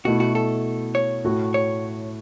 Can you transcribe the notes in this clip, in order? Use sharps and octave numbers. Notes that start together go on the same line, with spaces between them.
B2 A3 E4 F#4
F#4
A4
C#5
A2 A3 F#4
C#5